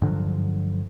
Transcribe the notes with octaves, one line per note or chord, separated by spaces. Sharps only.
G2 D3 F3 F#3